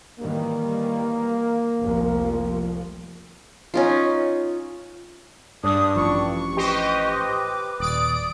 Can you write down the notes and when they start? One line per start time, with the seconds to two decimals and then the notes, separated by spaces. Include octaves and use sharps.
0.20 D#3 E3 G3 A#3
1.81 F1 C2 F3
3.74 C#4 D#4 F4
5.64 G2 D4 D#6
5.96 A1 F3 C#6
6.57 G4 B4 C5 D#5
7.27 D6
7.80 D#1 D5 D#6 D7